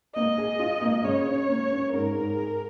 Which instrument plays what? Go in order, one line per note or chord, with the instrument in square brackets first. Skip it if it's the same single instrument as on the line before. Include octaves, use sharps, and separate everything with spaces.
[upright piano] A#3 [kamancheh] D#5
[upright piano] G#4
F4
A#3
[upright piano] C#3 [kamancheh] C#5
[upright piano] C#4
A#3
C#4
[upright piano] G#2 [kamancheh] A#4
[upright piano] G#2
G#4